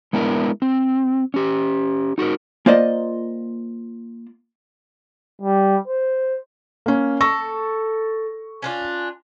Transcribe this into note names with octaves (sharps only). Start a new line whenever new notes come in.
G#3 B3 D4 E4 G4 A#4
C4
C#4 G4
D#4 F#4 G#4 A#4
A#3 F4 C5 D5 D#5
G3
C5
A#3 C#4
A4 C#6 E6 A#6
C#4 D4 F4